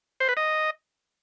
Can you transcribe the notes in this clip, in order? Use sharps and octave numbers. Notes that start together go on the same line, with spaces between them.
C5
B4
D#5